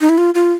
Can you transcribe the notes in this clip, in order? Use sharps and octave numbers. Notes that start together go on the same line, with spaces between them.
D#4
E4
F4
F4